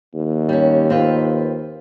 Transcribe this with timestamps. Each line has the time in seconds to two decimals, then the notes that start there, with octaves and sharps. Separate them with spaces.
0.15 D#2
0.49 G3 C#4
0.90 C4 F4 B4